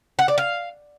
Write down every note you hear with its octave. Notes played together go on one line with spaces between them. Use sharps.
F#5
D5
F5